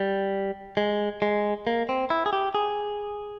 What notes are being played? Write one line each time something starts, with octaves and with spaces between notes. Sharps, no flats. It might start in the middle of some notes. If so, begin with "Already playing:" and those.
Already playing: G3
G#3
G#3
A#3
C4
E4
G#4
G4
G#4